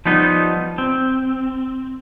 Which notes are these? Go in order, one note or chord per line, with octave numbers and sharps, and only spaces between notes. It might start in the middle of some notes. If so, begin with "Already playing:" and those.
F3 G3 B3 D#4
C4